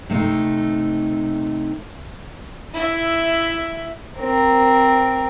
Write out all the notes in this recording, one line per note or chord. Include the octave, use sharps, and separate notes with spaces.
C3 A3 D#4
E4 E5
C4 A#4